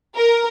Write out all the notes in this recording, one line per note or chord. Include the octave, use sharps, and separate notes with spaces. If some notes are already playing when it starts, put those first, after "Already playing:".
A#4